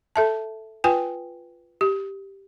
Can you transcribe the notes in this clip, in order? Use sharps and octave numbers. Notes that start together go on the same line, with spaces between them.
A4 E5 A5
F4 B4 G5 G#5
G4